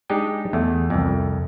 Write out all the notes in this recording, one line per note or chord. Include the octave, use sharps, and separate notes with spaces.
G#3 D4 D#4 G4 D#5
E2 A3
C2 F2